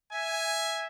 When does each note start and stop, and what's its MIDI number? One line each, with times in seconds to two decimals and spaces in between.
0.12 0.87 76
0.12 0.87 80